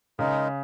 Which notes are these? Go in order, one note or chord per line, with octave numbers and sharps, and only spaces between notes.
C#3 G#3 D#4 A#4